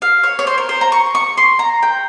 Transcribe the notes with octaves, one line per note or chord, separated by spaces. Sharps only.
F5
C#5
C#5
C5
A#4
C5
A#5
C#6
C#6
C6
A#5
G5